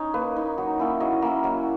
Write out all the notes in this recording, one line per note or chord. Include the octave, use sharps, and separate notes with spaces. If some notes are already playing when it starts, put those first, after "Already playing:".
Already playing: C#4 D#4 C#5
A#3 B4
D#4
F#3
A#3 C#4 E4
F#3 D#5
A#3 C#4 E4
F#3